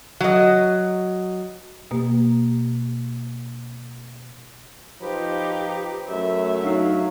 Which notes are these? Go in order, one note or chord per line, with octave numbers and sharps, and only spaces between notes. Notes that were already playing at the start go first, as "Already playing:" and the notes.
F#3 D#5
B2 A#3 G4
F3 D#4 G4 B4
F#2 A3 E5
F#3 D4 D#4 F5